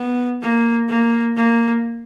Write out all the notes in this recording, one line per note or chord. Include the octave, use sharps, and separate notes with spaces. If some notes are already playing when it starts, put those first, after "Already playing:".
Already playing: B3
A#3
A#3
A#3